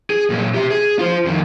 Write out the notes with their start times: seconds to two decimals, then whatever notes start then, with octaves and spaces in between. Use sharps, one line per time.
0.10 G#4
0.30 A#2 F#3
0.54 G4 E5
0.71 G#4
0.99 F4 C5
1.26 F2 D#3